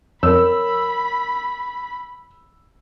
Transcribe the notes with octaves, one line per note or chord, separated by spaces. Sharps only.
F2 A#4 C#5 B5 E6